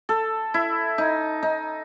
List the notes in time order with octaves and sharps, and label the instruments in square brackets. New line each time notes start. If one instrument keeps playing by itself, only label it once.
[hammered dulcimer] A4
E4
D#4
D#4